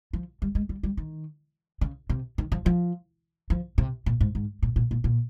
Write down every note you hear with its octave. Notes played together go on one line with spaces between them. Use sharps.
F3
G3
G#3
G3
G3
D#3
C#3
C3
D#3
F3
F3
F3
C3
A#2
G#2
G#2
A#2
A#2
A#2
A#2